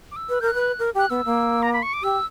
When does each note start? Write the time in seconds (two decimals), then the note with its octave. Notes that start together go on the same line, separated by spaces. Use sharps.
0.12 D6
0.16 E6
0.29 B4
0.41 A#4 G6
0.48 F#6
0.54 B4
0.79 A#4
0.94 G4 F#6
1.10 B3 E6
1.25 A#3
1.62 A#5
1.73 B5
1.83 C#6
1.93 D6
2.02 G4 E6